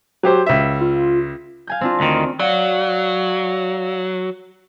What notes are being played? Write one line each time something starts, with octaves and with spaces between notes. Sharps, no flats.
F#3 G4 C5
C#2 E5
F4
F5 G#5 G6
C4 D4 F4
D2 D#3
F#3 D5 F5 F#5